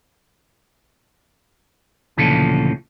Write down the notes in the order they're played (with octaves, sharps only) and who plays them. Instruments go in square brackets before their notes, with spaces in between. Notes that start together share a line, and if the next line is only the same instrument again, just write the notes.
[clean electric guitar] D2 A#2 C#3 E3 F3 A4